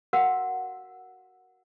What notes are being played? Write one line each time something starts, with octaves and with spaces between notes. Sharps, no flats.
F#4 A#4 F5 F#5